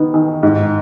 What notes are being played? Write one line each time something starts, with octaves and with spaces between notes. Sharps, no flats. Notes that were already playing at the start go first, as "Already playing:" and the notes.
Already playing: D#3 B3
D#3
G#2